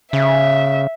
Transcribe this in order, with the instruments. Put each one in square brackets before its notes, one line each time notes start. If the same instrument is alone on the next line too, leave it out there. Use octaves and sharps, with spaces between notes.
[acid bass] C#3 [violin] E5